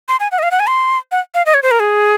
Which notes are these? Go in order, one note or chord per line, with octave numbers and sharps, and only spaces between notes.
C6
G#5
F#5
D#5
F5
F#5
G#5
C6
F#5
F5
D#5
C#5
C5
A#4
G#4